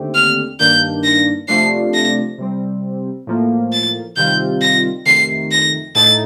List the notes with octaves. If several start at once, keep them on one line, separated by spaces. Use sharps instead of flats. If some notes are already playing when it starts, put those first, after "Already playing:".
Already playing: D#2 D3 A3 C4 G4
F6
G2 D#3 A#3 D4 G6
A#6
C3 F3 A3 D4 C7
A#6
C3 G3 C4
A2 F3 A#3
A6
C3 D#3 G3 C4 F4 G6
A#6
F2 C3 D#3 A3 C7
A#6
A2 A3 D#4 A6